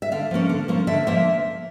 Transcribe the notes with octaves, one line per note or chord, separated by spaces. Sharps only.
E5
D3 F5
F3 A#3 C#4
D3
F3 A#3 C#4
D3 E5
F3 A#3 E5